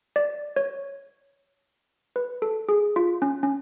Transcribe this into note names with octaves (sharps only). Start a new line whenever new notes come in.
D5
C#5
B4
A4
G#4
F4
C#4
C#4